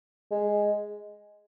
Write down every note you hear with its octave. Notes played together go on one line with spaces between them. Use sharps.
G#3